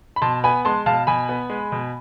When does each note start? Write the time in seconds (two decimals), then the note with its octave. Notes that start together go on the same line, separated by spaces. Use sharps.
0.16 B5
0.22 B2 A5 C6
0.44 B3 G#5 B5
0.65 G#3 A5 C6
0.86 B2 F5 A5
1.07 B2 G#5 B5
1.29 B3
1.50 G#3
1.72 B2